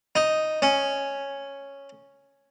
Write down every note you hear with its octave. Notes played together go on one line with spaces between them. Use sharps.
D#4
C#4